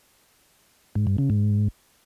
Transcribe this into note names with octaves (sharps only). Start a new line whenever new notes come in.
G#2
G2
C#3
G#2